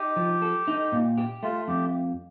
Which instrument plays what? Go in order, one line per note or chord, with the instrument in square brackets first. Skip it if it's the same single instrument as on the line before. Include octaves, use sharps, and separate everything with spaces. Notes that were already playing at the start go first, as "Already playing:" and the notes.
Already playing: [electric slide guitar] D#4 [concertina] G4
[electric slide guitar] F3
A4
D#4
A#2
G4
[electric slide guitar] A3 [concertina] F4
[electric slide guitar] F2 [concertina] G4